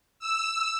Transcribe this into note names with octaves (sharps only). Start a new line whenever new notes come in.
E6